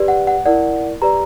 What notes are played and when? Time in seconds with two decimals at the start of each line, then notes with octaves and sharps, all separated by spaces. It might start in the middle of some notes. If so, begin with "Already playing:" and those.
Already playing: G4 B4 D5
0.08 F#5
0.27 F#5
0.46 E4 A#4 D5 F#5
1.02 G4 B4 D5 A#5